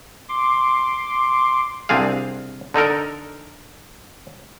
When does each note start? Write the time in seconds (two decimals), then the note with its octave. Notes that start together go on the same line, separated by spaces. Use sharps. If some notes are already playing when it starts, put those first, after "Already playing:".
0.29 C6 D6
1.89 C2 C4 D4 G#4 F5
2.74 D3 D#4 A4 A#4